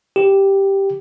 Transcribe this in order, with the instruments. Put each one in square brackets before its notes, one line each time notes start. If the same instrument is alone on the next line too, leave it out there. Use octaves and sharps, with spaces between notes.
[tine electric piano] G4